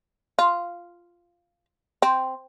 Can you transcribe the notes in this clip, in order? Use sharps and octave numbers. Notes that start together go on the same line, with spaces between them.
F4
C4